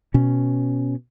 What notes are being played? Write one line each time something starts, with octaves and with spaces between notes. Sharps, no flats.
B2 C#4